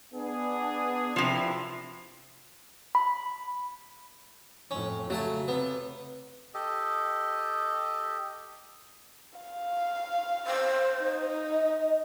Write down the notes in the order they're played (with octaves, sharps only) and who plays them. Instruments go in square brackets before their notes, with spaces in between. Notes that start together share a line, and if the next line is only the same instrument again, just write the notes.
[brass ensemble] B3 D4 G#4
[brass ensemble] F#1 D4 E4 [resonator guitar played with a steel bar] C3 F3
[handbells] B5
[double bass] F2 A2 [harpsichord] C#4
[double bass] C#3 [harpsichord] F#3 F#5 A5 [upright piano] A3
[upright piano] C3 [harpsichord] B3
[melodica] G4 A4 D#5
[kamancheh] F5
[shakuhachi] C5
[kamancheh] D#4
[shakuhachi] D#5